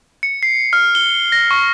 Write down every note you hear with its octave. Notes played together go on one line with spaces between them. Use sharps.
C#7
C7
F6
G7
A#6
C#6